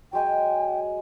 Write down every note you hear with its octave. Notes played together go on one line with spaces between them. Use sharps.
F#3 G#3 G5 G#5